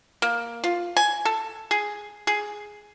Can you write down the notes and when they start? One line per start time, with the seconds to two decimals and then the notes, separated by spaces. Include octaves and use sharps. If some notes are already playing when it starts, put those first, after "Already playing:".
0.22 A#3
0.64 F4
0.97 G#5
1.25 A4
1.71 G#4
2.27 G#4